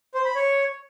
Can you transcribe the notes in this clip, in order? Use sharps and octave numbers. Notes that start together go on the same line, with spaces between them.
C5
B5
C#5